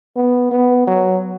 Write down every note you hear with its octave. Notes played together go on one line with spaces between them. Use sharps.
B3
B3
F#3